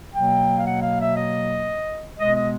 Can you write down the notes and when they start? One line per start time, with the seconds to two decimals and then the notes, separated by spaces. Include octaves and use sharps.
0.13 B2 F#3 A#3 G5
0.57 F5
0.65 F#5
0.82 F5
0.99 E5
1.16 D#5
2.18 B2 G#3 B3 D#5
2.35 D#5